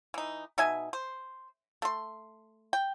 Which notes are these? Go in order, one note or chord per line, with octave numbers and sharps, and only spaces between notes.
E3 D#4
B2 D#4 E5 G#5
C5
A3 C6
G5